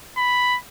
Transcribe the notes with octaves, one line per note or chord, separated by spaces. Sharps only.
B5